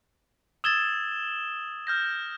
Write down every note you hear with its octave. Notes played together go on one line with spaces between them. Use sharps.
D#6 E6 G#6 A6 E7 G7
F6 G6 A#6